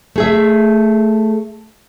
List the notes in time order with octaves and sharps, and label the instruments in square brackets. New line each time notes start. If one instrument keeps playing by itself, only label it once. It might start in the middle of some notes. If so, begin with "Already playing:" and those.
[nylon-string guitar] A3 G#4 E5